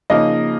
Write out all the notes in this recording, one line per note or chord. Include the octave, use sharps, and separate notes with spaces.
C#3 F3 A#3 D#4 D#5